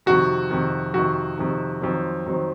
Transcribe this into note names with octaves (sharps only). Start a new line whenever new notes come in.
F2 C3 D#3 F#4
F2 C3 D#3
F2 C3 D#3 F#4
F2 C3 D#3
F2 D#3 F#3 C4
F2 D#3 F#3 C4